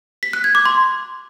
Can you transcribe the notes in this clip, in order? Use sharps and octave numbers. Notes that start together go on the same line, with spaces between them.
B6
F#6
G#6
D6
C6